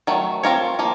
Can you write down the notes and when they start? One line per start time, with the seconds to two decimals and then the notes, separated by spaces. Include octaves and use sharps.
0.07 D#3 F#3 A3
0.43 C4 F4 A#4 C#5
0.79 F3 A#3